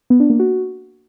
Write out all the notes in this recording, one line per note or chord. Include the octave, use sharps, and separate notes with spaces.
B3
D4
A#3
F#4